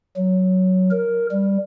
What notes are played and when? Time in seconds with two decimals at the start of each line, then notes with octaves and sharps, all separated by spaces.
0.17 F#3
0.91 A#4
1.32 G3